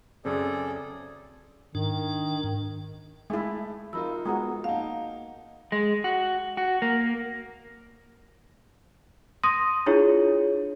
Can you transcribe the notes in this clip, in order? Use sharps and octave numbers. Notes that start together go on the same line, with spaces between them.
F#2 C#3 C4 G#4 A4 D5
G#2 D#3 D4
G#3 A3 E4
F3 D#4 F4 A#4 B5 E6
G#3 B3 F#4 A#5 D#6
A#3 D#4 F5 F#5 A5
G#3
F#4
F#4
A#3
C6 D#6 A#6 D#7
D4 E4 F4 G#4 C#5